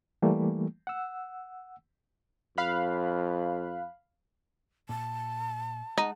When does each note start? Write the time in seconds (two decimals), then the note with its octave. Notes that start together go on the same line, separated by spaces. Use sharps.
0.22 E3 G3 A3 A#3
0.87 F#5 E6
2.58 F2 F5 B5 F#6
4.89 A#2 A5
5.98 G#3 D#4 F#5